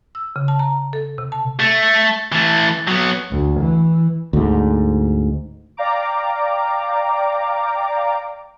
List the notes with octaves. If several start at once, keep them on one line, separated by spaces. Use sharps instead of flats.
E6
C#3
A5
A#5
A4
C3
A5
A3
E3 A3
F#3 B3
D2
E3
D2 G#2
D5 F5 G5 A#5 D6